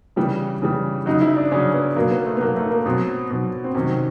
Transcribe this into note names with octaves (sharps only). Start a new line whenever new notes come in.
C#3 E3 G3
C#3 E3 G3
C#3 F#3 D#4
E4
D4
C#3 F#3 C#4
B3
B2 F#3 A#3
B3
A3
B3
B2 F#3 A#3
A3
A#3
B2 F#3 C4
B2 F#3
C4
C3 D#3 F#3 C#4